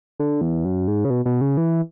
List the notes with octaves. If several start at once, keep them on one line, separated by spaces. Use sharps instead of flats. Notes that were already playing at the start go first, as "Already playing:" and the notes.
D3
E2
F#2
G#2
C#3
B2
B2
C#3
E3